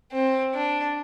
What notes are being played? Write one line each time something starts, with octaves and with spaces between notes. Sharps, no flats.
C4
D4